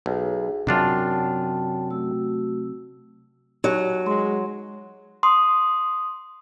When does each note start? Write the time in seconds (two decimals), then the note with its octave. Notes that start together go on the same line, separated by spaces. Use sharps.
0.06 B1 G#4
0.67 F#2 C3 F#3 D4 F4 F#4 G5 A5
1.90 A3 F#4 E6
3.64 F#3 D#4 G4 F#6
4.07 G#3 C6
5.23 C6 D#6